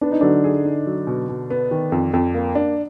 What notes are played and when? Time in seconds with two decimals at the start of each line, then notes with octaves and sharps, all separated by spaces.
0.01 B3 D4
0.11 D#4
0.21 D3 F#3 D4
0.44 G#4
0.65 D#4
0.87 F#3
1.07 B2
1.29 B2
1.50 B3
1.71 D#3
1.92 F2
2.14 F2
2.34 A#3
2.55 D4